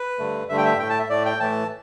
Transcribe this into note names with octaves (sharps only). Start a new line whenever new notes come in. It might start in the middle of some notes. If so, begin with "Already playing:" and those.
Already playing: B4
G2 D3 A3
G2 D3 A3 E5
G5
E5
A2 A3 G5
A5
E5
A2 A3 D5
G5
A2 E3 A3 A5